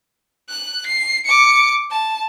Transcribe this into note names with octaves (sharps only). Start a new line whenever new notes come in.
F#6
C7
D6 C#7
A5